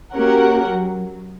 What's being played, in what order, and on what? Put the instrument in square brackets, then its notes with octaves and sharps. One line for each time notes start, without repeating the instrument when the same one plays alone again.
[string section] A#3 C#4 F#4 G4 A#4 F#5
F#3